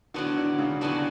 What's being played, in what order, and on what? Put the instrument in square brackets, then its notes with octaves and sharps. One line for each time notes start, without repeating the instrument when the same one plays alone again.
[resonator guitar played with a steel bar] A2 F#3 B3 D4 F#4 [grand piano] D3
[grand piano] D3
C#3
[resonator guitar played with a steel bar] A2 F#3 B3 D4 F#4 [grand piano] D3